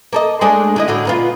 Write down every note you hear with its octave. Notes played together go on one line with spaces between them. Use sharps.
A#3 A4 D#5
G#3 A3 D4
D3 E4 D#5
A2 D3 F#4
A#2 B3 F4